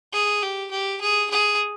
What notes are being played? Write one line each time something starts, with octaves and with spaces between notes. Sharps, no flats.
G#4
G4
G4
G#4
G#4